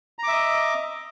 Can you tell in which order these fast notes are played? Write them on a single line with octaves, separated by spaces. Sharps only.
A#5 D6 E5 D#5